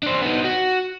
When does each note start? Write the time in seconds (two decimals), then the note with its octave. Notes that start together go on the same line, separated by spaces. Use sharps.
0.03 D4 C5
0.21 B3 D#4
0.44 F#4